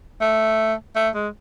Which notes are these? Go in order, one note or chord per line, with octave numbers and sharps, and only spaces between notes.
A3
A3
G#3